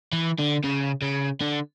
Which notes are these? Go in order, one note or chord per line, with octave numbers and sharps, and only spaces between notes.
E3
D3
C#3
C#3
D3